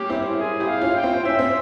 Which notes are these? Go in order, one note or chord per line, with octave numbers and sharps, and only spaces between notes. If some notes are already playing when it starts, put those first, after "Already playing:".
Already playing: G3 A#3 C#4 G4
C4 E4
G#4
E4 G4
F5
C#4 F4
G5
C4 E4
C#4 E5
C4